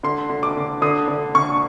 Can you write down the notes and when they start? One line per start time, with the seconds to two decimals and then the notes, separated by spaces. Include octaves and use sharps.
0.03 D3 C6
0.30 D3
0.43 D6
0.57 D3
0.82 D3 D#6
1.08 D3
1.35 D3 C#6